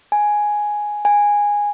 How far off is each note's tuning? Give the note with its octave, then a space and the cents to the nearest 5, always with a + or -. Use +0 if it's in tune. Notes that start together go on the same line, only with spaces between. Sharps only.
G#5 +5
G#5 -10